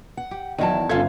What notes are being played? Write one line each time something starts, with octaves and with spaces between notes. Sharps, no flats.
F#5
G4
E2 D#3 F#3 E4 A5
G1 C#4 F4 A4 F5 G#6